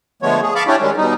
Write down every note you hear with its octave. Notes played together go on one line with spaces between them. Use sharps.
D3 F3 G#3 A3 B3 C#5
G#4
F5 A5 B5 C#6 D6
C#4 D4 E4 G4 C#5 D5
D#3 G3 G#3 C#4
B2 G3 D#4